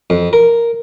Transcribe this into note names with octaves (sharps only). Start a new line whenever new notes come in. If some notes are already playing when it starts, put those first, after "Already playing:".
F2
A#4